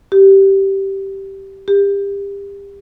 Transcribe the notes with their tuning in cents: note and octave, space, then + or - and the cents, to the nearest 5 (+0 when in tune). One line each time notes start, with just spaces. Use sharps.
G4 -10
G4 +30